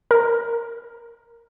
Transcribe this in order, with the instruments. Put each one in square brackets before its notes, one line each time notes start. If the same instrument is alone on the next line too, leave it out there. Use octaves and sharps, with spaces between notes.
[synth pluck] A#4